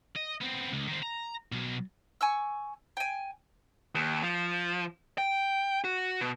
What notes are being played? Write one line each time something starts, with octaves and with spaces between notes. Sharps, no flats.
D#5
B3 C4
C#2
D#3 C4
A#5
B2 F#3
G#5 C#6 E6
G5 G#5
D#2
F3
G5
F#4
B2